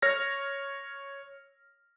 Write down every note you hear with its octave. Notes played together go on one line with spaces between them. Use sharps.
C#5 F6 A#6